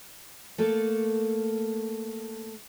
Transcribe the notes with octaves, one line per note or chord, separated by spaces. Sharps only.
A3 A#3 A4